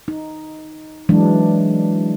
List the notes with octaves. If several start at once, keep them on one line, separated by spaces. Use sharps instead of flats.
D#4
E3 F#3 G#3 D4